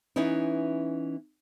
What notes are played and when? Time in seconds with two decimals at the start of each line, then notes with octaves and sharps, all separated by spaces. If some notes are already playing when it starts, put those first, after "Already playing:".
0.16 E3 B3 C#4 D#4 E4